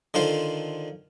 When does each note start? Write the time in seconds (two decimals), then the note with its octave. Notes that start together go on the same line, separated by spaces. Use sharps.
0.14 D3 D#3 F4 C5 F5